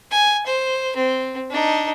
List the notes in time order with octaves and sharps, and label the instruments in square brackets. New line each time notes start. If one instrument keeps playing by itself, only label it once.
[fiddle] G#5
C5
C4
D4 D#4